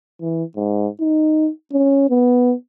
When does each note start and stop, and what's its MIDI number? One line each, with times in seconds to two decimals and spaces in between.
0.21 0.43 52
0.56 0.87 44
1.00 1.49 63
1.72 2.06 61
2.10 2.53 59